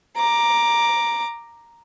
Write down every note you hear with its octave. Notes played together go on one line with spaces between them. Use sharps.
A#5 D6